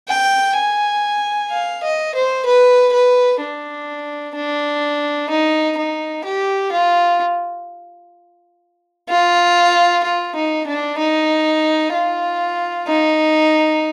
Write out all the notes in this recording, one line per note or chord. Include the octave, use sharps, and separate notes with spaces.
G5
G#5
F5
D#5
C5
B4
B4
D4
D4
D#4
D#4
G4
F4
F4
F4
D#4
D4
D#4
F4
D#4